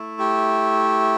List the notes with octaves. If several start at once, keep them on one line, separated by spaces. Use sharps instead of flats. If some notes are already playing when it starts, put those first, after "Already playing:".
Already playing: A3 E4
G4